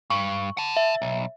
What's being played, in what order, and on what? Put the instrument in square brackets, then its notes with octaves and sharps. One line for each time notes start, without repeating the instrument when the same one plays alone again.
[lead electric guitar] G2 [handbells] C#6
[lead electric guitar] F#5 A5
[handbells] E5
[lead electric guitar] B1